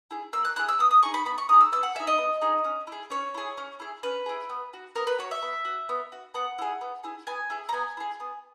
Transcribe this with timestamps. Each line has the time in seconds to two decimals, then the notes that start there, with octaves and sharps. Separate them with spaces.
0.11 E4 G#4
0.33 A#3 E6
0.45 F#6
0.56 E4 G#4 F#6
0.69 E6
0.79 B3 D#6
0.91 D#6
1.03 D#4 G#4 C#6
1.14 B5
1.25 B3 B5
1.38 C#6
1.49 D#4 G#4 D#6
1.61 E6
1.72 B3 E6
1.83 F#5
1.95 G#4 E5
2.00 D#4
2.07 D#5
2.18 B3
2.42 D#4 G#4
2.64 C#4
2.87 E4 G#4
3.10 C#4 C#5
3.34 E4 G#4
3.58 C#4
3.80 E4 G#4
4.03 C#4 B4
4.26 E4 G#4
4.50 B3
4.73 F#4
4.96 B3 A#4
5.07 B4
5.19 F#4 C#5
5.31 E5
5.42 B3
5.65 F#4
5.89 B3
6.12 F#4
6.34 B3 F#5
6.58 E4 G#4
6.81 B3
7.04 E4 G#4
7.27 B3 G#5
7.50 E4 G#4
7.69 A#5
7.73 B3 G#5
7.97 E4 G#4
8.20 B3